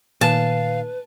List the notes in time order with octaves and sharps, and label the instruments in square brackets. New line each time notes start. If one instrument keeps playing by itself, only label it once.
[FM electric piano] A#2 D#3 [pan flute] B4 [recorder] F5 [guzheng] A5